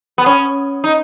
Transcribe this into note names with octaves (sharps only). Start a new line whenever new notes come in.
B3
C#4
D#4